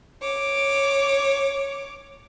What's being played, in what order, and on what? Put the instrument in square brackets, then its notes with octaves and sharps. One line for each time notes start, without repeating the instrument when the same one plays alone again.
[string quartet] C#5 D6